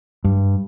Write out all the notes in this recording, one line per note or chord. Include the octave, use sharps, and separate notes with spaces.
G2